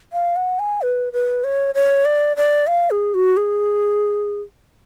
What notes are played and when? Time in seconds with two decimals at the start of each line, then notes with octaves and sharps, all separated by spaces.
0.13 F5
0.36 F#5
0.59 G#5
0.82 B4
1.13 B4
1.44 C#5
1.75 C#5
2.05 D5
2.37 D5
2.67 F5
2.91 G#4
3.14 F#4
3.37 G#4